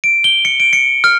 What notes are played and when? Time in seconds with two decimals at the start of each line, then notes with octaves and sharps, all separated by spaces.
0.04 D7
0.24 G7
0.45 C#7
0.60 D7
0.73 C#7
1.04 F6